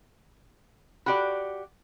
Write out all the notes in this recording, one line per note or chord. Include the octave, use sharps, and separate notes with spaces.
F#4 G4 D5 B5